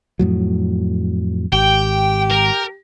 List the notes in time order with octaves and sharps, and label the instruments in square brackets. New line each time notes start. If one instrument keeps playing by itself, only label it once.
[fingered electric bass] F2 A2 F#3
[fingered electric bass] G#1 [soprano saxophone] G4 [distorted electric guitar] G5
[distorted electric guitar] A#4